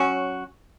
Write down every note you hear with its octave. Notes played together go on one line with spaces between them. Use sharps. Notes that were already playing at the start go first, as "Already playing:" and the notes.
Already playing: F#3 C#4 F#4